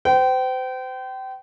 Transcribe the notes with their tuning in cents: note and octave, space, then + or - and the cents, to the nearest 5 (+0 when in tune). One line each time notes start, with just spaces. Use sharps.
C5 -35 G5 -30